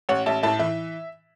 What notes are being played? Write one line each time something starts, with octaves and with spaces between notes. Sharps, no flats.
A1 C#5 F#5
A1 E5 A5
A2 E5 A5
E3 E5